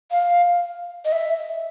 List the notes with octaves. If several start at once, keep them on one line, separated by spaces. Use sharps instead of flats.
F5
D#5
E5